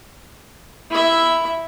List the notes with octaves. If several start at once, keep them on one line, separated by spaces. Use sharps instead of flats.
E4 E5